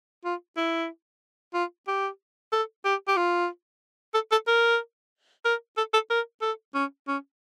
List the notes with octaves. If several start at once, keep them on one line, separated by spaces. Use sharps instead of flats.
F4
E4
F4
G4
A4
G4
G4
F4
A4
A4
A#4
A#4
A4
A4
A#4
A4
C#4
C#4